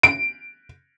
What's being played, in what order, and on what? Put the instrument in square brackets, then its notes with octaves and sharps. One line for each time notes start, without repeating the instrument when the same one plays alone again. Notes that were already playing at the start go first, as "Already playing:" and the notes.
[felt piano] D7